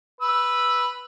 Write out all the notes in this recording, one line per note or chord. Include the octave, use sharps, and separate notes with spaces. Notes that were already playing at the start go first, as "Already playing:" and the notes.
B4 E6